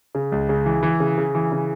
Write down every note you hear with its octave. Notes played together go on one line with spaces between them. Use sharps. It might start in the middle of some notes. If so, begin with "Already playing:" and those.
C#3
C#2
C#3
E3
E3
C#3
C#3
E3
C#3